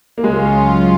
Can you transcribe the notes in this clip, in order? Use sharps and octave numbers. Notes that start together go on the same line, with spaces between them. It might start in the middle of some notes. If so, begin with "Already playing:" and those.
A#3
C#2 C#3 F#3 G#3 C#4 F4